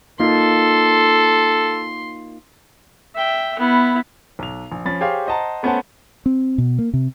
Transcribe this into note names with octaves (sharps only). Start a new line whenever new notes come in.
A#3 D#4 F4 A4 C6
E5 G5
B3 E4
B1 F7
A#1
F3 C#4 B5 A6
G4 G#4 C5 C#5 F5
C5 D#5 F#5 A5 A#5
A3 B3 C#4 C5 F#5 A5
C4
B2
A#3
C3